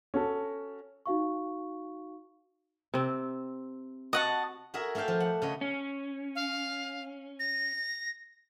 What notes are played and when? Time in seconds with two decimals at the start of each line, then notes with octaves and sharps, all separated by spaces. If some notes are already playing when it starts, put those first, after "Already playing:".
0.14 C#4 F#4 A4
1.06 D#4 F#4 F5 C#6
2.94 C3 C4
4.13 F#4 D#5 F#5 A5
4.74 F#4 G#4 A#4 E5
4.95 A3 D4 A4 F5 G5
5.08 F3
5.20 F#5
5.42 C#3 C#5 D#5
5.61 C#4
6.35 F5
7.39 A#6